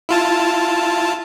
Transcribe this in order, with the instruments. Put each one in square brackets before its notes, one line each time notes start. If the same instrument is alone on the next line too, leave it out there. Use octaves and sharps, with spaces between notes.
[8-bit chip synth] E4 F4 A5